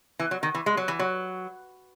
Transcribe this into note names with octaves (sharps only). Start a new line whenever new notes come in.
E3
F#3
D#3
E3
G#3
F#3
E3
F#3